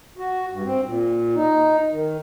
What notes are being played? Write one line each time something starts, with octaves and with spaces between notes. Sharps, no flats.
F#4
G2
C4
A#2
D#4
D#3